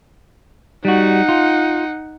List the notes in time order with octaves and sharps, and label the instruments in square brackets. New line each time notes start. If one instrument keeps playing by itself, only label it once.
[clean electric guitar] G3 F#4 [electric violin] D#4 F#5
[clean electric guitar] F4